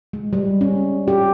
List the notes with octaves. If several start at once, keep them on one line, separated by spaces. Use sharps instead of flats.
G#3
G3
C#4
G4